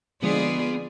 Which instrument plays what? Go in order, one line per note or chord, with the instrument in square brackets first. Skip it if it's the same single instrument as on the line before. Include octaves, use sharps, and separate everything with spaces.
[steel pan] D3 F3 G#3 [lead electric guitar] B3 [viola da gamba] F4 G#4 D5